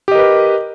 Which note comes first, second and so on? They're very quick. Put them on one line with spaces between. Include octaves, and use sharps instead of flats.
G4 D#5 A#4 B4